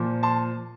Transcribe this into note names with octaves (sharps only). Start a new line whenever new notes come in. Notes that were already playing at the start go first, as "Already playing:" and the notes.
Already playing: A#2 F3
A5 C6